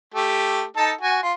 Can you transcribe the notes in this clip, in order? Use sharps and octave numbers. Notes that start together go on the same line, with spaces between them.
A3 G4
D#4 A4 A5
F#4 G#5
F4